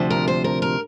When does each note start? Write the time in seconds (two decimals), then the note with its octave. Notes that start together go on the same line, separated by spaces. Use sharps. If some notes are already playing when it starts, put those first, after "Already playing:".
Already playing: D2 C3 F3
0.10 A#4
0.28 C5
0.44 A#4
0.62 A#4